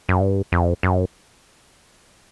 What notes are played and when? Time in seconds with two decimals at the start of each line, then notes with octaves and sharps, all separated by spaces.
0.09 F#2
0.20 G2
0.52 F2
0.83 F#2